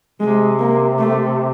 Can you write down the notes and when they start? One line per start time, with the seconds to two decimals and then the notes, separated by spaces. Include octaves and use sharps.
0.20 C3 G#3
0.59 A#3
0.99 A3